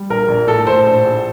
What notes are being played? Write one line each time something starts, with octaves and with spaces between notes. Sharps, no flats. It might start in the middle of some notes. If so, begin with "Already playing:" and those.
Already playing: G3
A#1 A#4
A#1
A2 A4
A2 A4 C5
A#1
A#1